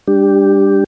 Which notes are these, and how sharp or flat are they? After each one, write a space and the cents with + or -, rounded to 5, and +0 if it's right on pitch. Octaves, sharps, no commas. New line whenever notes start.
G3 +35 D4 +0 G4 +0